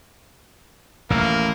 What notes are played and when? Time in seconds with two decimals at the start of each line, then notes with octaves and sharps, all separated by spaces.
1.10 A1 D#2 A#3